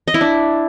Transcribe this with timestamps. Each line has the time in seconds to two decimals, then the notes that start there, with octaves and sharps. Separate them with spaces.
0.08 D#5
0.14 E4
0.21 D4